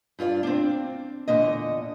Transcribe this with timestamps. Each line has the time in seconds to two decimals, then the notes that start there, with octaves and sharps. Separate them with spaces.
0.19 G2 F4 F#4 D5
0.43 C4 D4
1.28 E2 A#2 D3 D#5